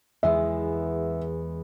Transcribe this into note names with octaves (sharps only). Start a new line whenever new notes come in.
E2 G#3 B3 E5